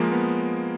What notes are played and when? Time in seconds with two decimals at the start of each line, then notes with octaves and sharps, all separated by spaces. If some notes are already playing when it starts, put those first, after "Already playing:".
Already playing: F3 G#3 A#3
0.12 B3